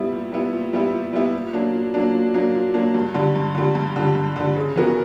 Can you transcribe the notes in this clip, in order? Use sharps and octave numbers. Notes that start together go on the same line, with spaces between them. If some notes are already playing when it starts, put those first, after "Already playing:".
Already playing: G3 B3 E4
A#2
G3 B3 E4
A#2
G3 B3 E4
A#2
G3 B3 E4
A#2
F#3 A#3 D4
A#2
F#3 A#3 D4
A#2
F#3 A#3 D4
A#2
F#3 A#3 D4
G2
D3 G3
G2
D3 G3
G2
D3 G3
G2
D3 G3
C#3
E3 B3 F#4 A#4